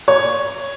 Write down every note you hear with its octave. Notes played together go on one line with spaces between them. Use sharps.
C#5